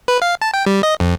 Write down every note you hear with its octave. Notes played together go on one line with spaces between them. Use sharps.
B4
F5
A5
G5
G3
D#5
F2